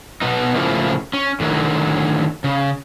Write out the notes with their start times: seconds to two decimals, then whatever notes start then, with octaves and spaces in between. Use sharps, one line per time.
0.21 B2 B3 D#4
0.56 A2 C#3 F3 A#3 E4
1.13 C#4
1.40 A2 D3 D#3 F#3
2.44 C#3